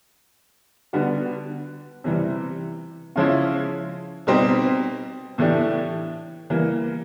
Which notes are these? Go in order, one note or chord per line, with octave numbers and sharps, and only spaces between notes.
D3 G3 B3 D4 F#4
C3 E3 G3
C#3 F3 G#3 C#4 E4
B2 G3 C4 D#4 G4
A2 E3 A3 D4 G4
E3 G3 A#3